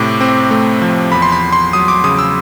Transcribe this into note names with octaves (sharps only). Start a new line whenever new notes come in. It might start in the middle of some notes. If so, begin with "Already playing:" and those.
Already playing: A2 C3 D6
C4
A3
F3
E2 B5
C6
B5
E2
C6
F#3 D#6
D6
C#3 D#6
E6